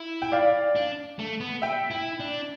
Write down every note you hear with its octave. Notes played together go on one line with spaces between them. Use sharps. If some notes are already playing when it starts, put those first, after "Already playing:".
Already playing: E4
G5
D5 F5
D4
A3
B3
E5 G5
E4
D4